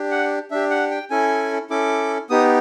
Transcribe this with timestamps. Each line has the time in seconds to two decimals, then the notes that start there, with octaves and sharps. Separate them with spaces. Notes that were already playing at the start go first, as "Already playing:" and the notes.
Already playing: D4 G4
0.11 F#5
0.51 D4 G4 E5
0.71 F#5
0.91 G5
1.10 C#4 E4 A4 G#5
1.70 C#4 E4 A4 D6
2.30 B3 D#4 G4 D#6